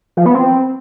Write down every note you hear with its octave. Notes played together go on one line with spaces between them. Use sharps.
F3
B3
C4